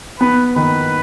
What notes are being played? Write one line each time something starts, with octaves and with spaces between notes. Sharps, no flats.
B3 B4
D#3 B4